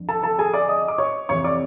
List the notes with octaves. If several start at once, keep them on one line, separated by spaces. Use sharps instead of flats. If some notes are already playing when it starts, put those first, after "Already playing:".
Already playing: F2 D3 F3
A4 A5
A4 A5
G#4 G#5
D5 D6
D#5 D#6
D6
C#5 C#6
F2 C3 E3 C#5 C#6
D5 D6